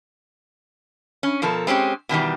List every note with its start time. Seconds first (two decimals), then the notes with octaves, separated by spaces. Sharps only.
1.23 C#4
1.42 B2 F3 A4 A#4
1.67 G#3 C4 C#4 G4
2.09 B2 D#3 E3 G3